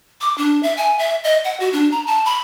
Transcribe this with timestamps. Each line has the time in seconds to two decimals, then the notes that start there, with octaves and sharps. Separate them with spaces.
0.21 D6
0.38 D4
0.63 E5
0.77 G#5
0.99 E5
1.24 D#5
1.44 F#5
1.60 F#4
1.73 D4
1.91 A#5
2.07 A5
2.25 B5